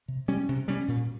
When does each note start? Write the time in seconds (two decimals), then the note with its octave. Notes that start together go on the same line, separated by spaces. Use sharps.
0.08 C3
0.28 G3 C#4
0.49 C3
0.68 G3 C#4
0.88 A#2